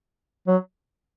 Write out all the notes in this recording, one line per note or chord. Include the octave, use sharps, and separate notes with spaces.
F#3